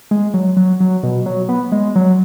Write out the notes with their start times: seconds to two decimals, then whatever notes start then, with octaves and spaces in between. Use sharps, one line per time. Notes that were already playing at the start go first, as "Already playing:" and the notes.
0.11 G#3
0.34 F#3
0.57 F#3
0.80 F#3
1.03 B2
1.26 F#3
1.49 B3
1.72 G#3
1.96 F#3